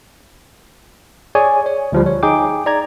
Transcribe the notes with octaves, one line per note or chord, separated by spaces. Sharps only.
G#4 C#5 D5 G#5
C#5
D2 F3 G3
C#5
D#4 G#4 G5 D6
D5 A#5 G#6